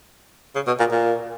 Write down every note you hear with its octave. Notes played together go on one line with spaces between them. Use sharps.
C#3
B2
A#2
A#2